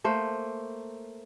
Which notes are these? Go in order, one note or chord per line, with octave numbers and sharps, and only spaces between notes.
A3 A#3 C5